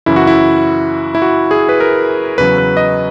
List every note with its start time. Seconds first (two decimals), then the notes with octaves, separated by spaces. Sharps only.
0.06 F#2 C#3 E3 E4
0.16 F#4
0.27 E4
1.15 E4
1.22 F#4
1.51 G#4
1.69 B4
1.80 A#4
2.38 E2 C#3 F#3 B4
2.58 B4
2.77 D#5